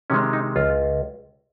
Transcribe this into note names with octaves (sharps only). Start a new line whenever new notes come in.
C3 D#3 G#3 C#4
D#4
C#2 F4